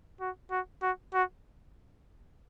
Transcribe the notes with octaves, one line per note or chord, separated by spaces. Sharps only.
F#4
F#4
F#4
F#4